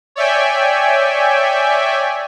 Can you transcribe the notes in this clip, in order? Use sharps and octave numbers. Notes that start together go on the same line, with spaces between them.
C#5 D5 E5 G5 G#5